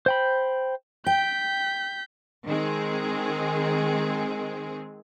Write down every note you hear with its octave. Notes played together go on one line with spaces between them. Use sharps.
C5 G5 B5
G5 G6 B6
D#3 G#3 C4 G#4